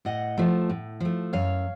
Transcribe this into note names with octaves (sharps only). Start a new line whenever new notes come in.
A2 D#5 F#5
F3 A3
A2
F3 A3
F#2 C#5 F5